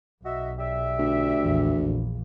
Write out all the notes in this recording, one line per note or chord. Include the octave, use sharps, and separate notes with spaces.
B1 F#4 D#5 E5
G4 D5 E5
D2
A#1 E2
A#1